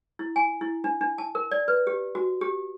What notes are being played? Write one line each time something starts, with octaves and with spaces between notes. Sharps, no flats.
E4
G#5
E4
D4
D4
A5
A#4
D5
B4
G4
F#4
G4